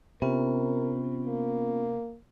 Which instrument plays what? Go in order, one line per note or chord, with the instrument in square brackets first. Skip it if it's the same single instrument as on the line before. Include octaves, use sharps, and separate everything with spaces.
[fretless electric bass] C3 [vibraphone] B3 C#4 F4 [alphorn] A#4
[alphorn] A#3